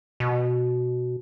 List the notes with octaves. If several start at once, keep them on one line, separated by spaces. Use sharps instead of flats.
B2